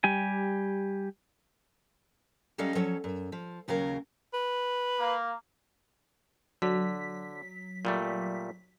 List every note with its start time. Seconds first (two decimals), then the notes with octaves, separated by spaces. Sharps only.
0.04 G3 G4 G#5
2.58 F#3 G3 C#4 A4 D#5 F5
2.75 F3 F#3 C#4 A4
3.04 F#2
3.32 F3
3.68 D#2 C#3 F#3 A#4 F5
4.34 B4
4.99 A#3
6.62 D3 F#3 B6
7.85 A#2 G3 A3